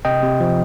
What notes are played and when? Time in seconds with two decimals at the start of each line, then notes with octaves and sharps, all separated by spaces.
0.05 C3 D#5 G5
0.23 C3
0.40 F3